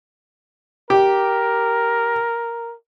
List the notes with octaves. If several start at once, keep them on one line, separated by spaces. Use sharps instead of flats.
G4 A#4